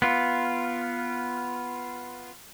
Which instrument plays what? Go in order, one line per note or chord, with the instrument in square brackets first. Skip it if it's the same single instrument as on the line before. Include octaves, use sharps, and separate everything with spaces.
[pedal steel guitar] B3 F4